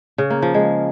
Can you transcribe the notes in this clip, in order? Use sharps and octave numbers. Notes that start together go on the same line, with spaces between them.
C#3
A#3
F3
G#3